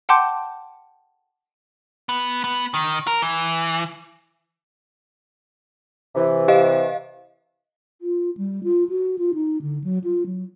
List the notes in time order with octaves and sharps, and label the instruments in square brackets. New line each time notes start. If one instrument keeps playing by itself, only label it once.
[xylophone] F#5 G5 A5 C6 D6 G6
[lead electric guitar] B3
B3
D#3
A#4
E3
[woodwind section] C3 E3
[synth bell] G4 D#5 F5
[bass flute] F4
G3
F4
F#4
F4
D#4
D3
F#3
F4
F#3